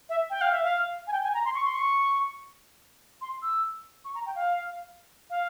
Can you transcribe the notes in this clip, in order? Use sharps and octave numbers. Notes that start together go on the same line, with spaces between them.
E5
G5
F5
E5
F5
G#5
G5
G#5
A#5
C6
C#6
C6
C#6
C6
E6
C#6
A#5
G5
F5
F5